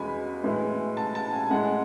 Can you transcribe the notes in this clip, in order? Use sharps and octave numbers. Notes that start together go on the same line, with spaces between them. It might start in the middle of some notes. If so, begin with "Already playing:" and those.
Already playing: E2 B2 G#3 G#5 B5
A2 E3 G#3
A5
A5
G#5
G#5
A2 G#3 F#5